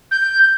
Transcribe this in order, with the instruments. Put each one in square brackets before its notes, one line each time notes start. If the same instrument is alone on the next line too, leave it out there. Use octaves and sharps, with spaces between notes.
[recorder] G6